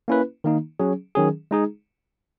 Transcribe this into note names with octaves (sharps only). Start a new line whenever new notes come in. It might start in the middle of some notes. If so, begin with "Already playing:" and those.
A#3 C#4 E4 B4
D#3 A#3 D#4
F#3 C#4 G#4
D#3 F#3 C#4 G#4
G#3 D#4 G#4